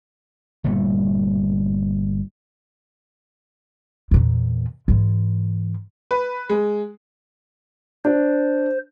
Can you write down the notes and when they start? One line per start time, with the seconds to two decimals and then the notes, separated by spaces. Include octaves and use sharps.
0.64 G1 A#2 G3 A3
4.11 E2 A#2
4.88 G#2 E3
6.11 B4
6.49 G#3
8.05 D4 C5